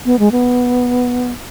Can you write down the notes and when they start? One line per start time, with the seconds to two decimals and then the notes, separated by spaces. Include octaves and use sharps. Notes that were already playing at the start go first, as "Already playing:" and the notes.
0.05 B3
0.19 G#3
0.32 B3